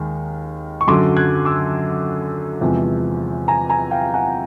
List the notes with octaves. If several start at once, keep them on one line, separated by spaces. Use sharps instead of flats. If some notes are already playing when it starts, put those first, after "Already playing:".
Already playing: D#2 D#3 G#3
C#6
F#2 D3 F#3 C6 D6
F#6 G#6
D6 E6
E2 C3 F3 G#3
G#5 A#5
G#5 A#5
F5 G5
F#5 G#5